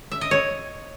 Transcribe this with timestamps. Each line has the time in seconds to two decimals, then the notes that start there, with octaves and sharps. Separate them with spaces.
0.11 E5
0.21 D#5
0.31 C#5